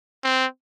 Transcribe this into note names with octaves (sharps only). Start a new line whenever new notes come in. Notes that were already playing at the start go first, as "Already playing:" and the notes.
C4